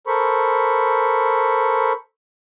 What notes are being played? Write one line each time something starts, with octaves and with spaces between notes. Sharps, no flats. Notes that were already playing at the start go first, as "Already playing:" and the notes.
A4 A#4 C5 B5 C#6